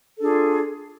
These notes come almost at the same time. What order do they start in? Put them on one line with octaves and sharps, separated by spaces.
A4 D4 G#4 F4